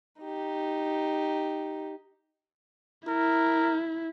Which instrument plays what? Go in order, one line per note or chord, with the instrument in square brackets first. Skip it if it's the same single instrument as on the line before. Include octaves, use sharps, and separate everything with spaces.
[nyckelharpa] D#4 G4
[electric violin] E4 [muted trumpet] A#4